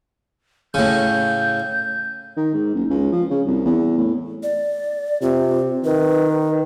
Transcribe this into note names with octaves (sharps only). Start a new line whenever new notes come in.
A2 C#3 G6
D#3
G#2
F#1
C#2
F3
C#3
C2
E2
A2
D5
C3 F4
D#3 B4